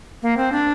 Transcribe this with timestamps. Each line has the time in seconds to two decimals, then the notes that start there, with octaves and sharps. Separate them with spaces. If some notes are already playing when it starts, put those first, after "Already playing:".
0.22 A#3
0.37 C4
0.52 D4